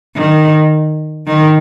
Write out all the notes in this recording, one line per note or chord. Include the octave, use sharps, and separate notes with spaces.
D#3
D#3